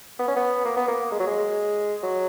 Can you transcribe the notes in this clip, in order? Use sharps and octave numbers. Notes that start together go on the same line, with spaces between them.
B3
C#4
B3
A#3
B3
A#3
G#3
F#3
G#3
F#3